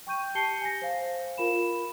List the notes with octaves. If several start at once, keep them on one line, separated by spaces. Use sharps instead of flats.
G5 C#6 G6 D#7
G4 A5 G6 C7 C#7 G7
G#5 A#6
C5 F5
F4 A#4 F5 B5 E7